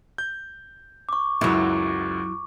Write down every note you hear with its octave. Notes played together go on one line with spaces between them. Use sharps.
G6
C#6 D6
C#2 F#2 F#3 E4 F#4